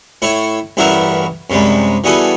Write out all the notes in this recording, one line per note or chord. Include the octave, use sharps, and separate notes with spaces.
A2 E4 C#5
A1 G2 E4 F#4 A#4 E5
F#2 C3 G3 G#3
E3 G3 B3 F#4 G#4 A4